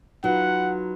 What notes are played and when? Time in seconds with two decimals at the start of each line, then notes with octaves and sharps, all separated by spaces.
0.24 F#3 D#4 F4 B4 F#5